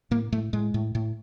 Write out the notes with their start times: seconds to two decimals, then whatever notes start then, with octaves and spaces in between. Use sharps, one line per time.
0.11 A2 A#3
0.32 A2 A3
0.53 A2 G#3
0.74 A2
0.95 A2